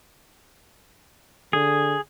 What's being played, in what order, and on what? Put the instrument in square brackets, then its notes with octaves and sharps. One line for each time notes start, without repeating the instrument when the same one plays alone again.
[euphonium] D3 [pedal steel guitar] G#4